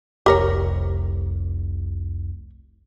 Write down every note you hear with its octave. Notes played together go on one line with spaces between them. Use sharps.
F1 C2 G4 A#4 C#5